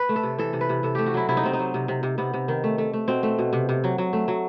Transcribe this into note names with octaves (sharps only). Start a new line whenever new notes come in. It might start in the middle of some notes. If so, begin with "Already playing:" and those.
Already playing: B4
A3
A4
C3
E3 A4
C3
B4
C3
C3 A4
A3 G4
F#4
F#3 E4
C3 E4
D#4
C3 C4
D#4
F#3
C3
C3
C3
C3 B3
C3
D#3
A3
A3
A3
B2 C4
A3
B2
C3
C3
F#3
F#3
A3
F#3